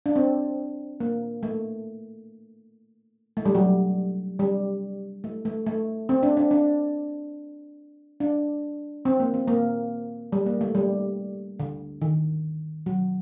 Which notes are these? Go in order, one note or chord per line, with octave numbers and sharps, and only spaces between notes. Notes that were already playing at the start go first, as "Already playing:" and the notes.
D4
C4
A#3
A3
A3
G3
F#3
G3
A3
A3
A3
C4
D4
D4
D4
D4
C4
A#3
C4
A#3
G3
A#3
A3
G3
D3
D#3
F#3